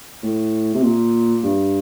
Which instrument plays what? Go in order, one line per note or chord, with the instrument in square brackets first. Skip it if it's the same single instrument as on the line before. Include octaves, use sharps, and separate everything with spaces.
[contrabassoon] A2
C3
A#2
G2